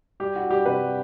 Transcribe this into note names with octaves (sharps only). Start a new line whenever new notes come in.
G3 G4
E4 F#4
G3 G4
C3 B4
G3